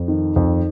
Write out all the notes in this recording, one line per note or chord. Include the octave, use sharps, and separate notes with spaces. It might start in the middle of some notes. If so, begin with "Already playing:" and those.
Already playing: F2
D#3
F2